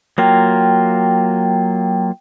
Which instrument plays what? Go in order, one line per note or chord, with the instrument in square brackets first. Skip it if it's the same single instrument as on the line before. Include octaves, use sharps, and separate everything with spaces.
[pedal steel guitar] F#3 A#3 F4 [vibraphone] G5